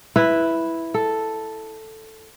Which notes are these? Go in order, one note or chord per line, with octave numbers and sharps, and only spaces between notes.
E4 B4
A4